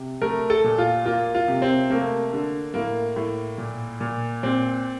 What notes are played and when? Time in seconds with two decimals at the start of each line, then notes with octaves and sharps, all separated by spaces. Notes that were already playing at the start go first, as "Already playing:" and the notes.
Already playing: C3
0.22 A3 A#4
0.50 A4
0.64 A#2
0.78 F4
1.05 A#3 F4
1.35 F4
1.48 C3
1.62 C4
1.90 A3 A#3
2.33 D3
2.74 A2 A#3
3.16 A2
3.58 A#2
4.00 A#2
4.43 A#2 C4